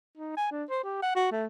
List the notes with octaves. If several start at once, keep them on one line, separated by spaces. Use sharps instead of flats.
D#4
G#5
D4
C5
G4
F#5
F#4
A3